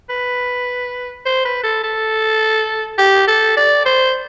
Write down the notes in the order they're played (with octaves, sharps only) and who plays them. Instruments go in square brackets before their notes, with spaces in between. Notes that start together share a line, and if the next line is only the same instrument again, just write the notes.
[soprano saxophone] B4
C5
B4
A4
A4
G4
A4
D5
C5